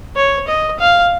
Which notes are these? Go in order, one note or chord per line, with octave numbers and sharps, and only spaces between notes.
C#5
D#5
F5